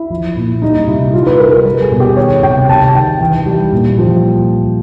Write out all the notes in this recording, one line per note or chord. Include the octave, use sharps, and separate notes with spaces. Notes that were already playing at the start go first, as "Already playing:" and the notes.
Already playing: E4
F3
A#2
G3 D#4
C3 E4
G3 F4
B4
G3 A#4
A#4
G3 A4
G#4
B2
G4
D#3 C#5
C3 G5
C3 A5
D#3 G5
E3
G3
A#2
F3